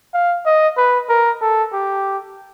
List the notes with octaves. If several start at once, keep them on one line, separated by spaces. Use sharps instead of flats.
F5
D#5
B4
A#4
A4
G4